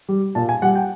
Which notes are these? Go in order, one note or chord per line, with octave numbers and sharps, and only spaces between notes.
G3
A#2 A5
G#5
G3 F#5
G5